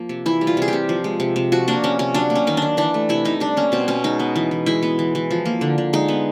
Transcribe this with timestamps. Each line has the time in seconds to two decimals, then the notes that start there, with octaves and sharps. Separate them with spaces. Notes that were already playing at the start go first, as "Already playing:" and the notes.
Already playing: F3 A#3
0.09 C3
0.26 E3 E4
0.41 G3
0.47 F4
0.57 C3 G#4
0.68 C3 G4
0.89 F3
1.04 G#3
1.20 C3
1.36 C3
1.52 F3 F#4
1.68 A#3 D4
1.84 C3 C#4
1.99 C3 C#4
2.14 F#3 D4
2.30 A#3
2.35 C#4
2.47 D#3 D#4
2.57 D#3 D4
2.77 E3 D4
2.94 A3
3.09 C3 E4
3.25 C3 D#4
3.40 G3 D4
3.57 A#3 C#4
3.72 B2 C4
3.88 B2 C#4
4.04 G#3 D#4
4.19 B3
4.36 E3
4.51 E3
4.66 G#3 E4
4.82 B3
4.99 E3
5.15 E3
5.31 F3
5.45 A#3
5.61 D3
5.78 D3
5.93 G#3 D#4
6.08 B3